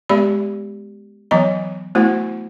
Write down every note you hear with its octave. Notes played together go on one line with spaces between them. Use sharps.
G#3 B3 G4 D5 E5 B5
E3 F#3 B3 C#5 D#5 A#5
A3 B3 E4 F#4 C5 F#5